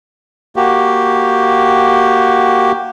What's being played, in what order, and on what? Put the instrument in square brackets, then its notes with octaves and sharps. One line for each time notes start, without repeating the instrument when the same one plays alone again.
[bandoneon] A#3 F#4 G4